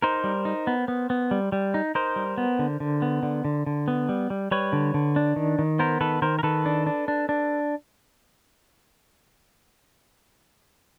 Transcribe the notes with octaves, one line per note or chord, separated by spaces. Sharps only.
D#4 A#4 C5
G3
D#4
B3
B3
B3
G3
G3
D#4
D#4 A#4 C5
G3
B3
D3
D3
B3
D3
D3
D3
B3
G3
G3
G3 B4 C#5
D3
D3
D4
D#3
D#3
B3 A#4 C5
D#3 A4 B4
D#3 A#4 C5
A#4
D#3 A4 B4
D4
D4
D4
D4